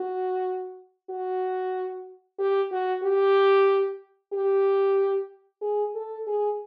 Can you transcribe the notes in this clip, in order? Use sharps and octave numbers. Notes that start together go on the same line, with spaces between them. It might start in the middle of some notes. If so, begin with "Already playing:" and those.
Already playing: F#4
F#4
G4
F#4
G4
G4
G#4
A4
G#4